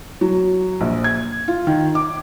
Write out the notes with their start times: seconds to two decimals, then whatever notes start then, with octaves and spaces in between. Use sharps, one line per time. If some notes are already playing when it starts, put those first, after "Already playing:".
0.21 F#3
0.81 A#1
1.04 G#6
1.48 F4
1.67 D#3
1.95 D6